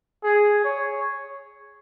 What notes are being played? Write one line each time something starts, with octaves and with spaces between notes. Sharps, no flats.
G#4
C#5